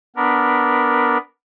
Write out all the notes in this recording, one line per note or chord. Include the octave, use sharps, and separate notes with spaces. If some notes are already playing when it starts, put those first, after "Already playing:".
B3 D4 A#4 B4